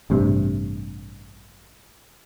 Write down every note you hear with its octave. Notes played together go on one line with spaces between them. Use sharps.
A1 G2 C3